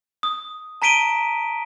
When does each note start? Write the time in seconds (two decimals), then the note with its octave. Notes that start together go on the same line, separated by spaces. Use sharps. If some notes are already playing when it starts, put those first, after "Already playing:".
0.23 D#6
0.82 A5 A#5 B6 D7 D#7 G7